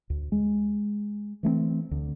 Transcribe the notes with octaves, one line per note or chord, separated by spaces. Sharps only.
D2
G#3
E3 A3 A#3 C4
D2